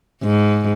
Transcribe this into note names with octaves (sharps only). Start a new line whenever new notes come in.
G#2